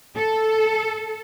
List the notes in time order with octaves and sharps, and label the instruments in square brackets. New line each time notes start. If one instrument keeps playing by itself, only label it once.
[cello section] A4